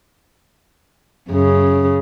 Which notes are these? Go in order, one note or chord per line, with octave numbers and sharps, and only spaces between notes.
F#2 C#3